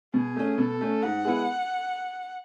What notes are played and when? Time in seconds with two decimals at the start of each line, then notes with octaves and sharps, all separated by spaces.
0.14 B2 G#4
0.36 A3 C#4
0.58 B2 A4
0.81 A3 C#4
1.02 G#2 F#5
1.25 G#3 B3 E4